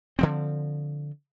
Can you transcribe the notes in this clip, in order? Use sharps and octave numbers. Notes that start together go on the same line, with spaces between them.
D3 F3 C4